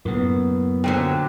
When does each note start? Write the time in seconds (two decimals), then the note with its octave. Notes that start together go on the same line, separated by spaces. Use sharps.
0.05 F#2 A2 C#3 A#3 B3
0.84 A#2 D3 F#3 C5 G5